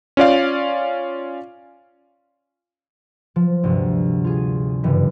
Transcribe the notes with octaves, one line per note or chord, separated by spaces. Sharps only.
C#4 F4 D5 F5
F3
D2 G2 C3
F4 G#4
F#1 G2 E3 B6